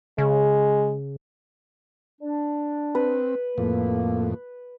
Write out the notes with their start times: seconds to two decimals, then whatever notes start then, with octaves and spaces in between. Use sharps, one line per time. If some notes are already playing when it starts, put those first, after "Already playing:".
0.18 C#3 G#3
2.22 D4
2.95 C4 B4
3.58 F2 A2 A#3